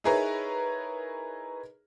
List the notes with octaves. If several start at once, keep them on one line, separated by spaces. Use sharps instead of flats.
D#4 E4 G#4 A#4 B4 C#5